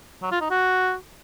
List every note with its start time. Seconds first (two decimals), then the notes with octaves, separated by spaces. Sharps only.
0.22 F#3
0.32 F4
0.41 D#4
0.50 F#4